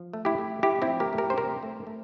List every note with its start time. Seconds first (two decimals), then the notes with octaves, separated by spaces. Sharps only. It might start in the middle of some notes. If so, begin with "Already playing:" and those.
Already playing: F3
0.13 A3
0.25 E4 G4
0.38 A3
0.63 A3 E4 G4
0.82 C4 E4
0.87 F3
1.00 G4 A#4
1.13 A3
1.18 G4 A#4
1.30 C5
1.37 C2 G4 A#4
1.63 A3
1.87 A3